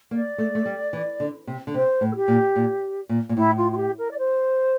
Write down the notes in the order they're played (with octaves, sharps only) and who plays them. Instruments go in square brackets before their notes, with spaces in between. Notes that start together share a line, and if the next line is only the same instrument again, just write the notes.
[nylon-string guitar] A#3 [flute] D5
[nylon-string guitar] A3
A3
G3
E3
D3
C3
D3
[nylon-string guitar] C3 [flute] C5
[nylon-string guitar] A2
[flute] A4
G4
[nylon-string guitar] A#2
A#2
A#2
A#2
[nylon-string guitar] A2 [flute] E4
[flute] F4
F4
G4
A#4
D5
C5